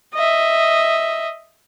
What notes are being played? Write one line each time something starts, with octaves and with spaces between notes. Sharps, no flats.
D#5 E5